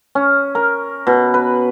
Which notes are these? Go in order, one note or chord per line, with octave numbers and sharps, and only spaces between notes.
C#4
A#4
B2
B4